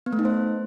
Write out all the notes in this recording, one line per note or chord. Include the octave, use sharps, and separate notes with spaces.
B3
A3
D#4
C5